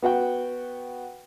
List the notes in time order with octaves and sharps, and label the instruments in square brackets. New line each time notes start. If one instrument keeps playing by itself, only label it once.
[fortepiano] B3 F#4 F#5 G5